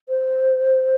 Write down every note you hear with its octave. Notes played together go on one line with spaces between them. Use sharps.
C5